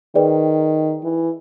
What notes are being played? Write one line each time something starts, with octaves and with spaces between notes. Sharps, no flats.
D#3 G#4 B4 D5 G5
E3